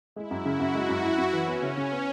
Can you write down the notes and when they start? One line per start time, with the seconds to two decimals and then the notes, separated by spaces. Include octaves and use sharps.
0.16 G#3 E4
0.31 F#2
0.45 C#3 F#4
0.60 F#2
0.74 G#3 E4
0.89 F#2
1.04 F#2
1.18 F#2
1.33 E3 C#4
1.48 B3
1.62 C#3
1.77 C#3
1.92 B3